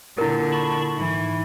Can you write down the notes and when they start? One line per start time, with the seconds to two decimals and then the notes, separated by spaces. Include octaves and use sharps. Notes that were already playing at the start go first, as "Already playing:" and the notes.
0.18 A#2 D3 E4 A#4
0.52 A5 B5 C#6
0.97 G#2 E3